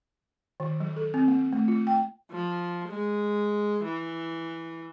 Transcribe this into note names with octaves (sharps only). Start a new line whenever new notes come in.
D#3
F#3
A4
C4
A#3
A3
F4
G5
F3
G#3
E3